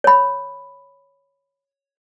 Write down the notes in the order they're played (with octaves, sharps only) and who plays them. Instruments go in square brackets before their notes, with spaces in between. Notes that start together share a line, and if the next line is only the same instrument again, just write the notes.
[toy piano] C#5 B5